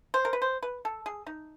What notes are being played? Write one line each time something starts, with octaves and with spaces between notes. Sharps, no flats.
C5
A#4
B4
C5
B4
A4
G#4
D#4